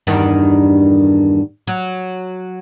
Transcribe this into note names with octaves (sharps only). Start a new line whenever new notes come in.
E2 G2 D#3
F#3